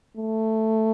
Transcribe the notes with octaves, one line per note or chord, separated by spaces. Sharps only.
A3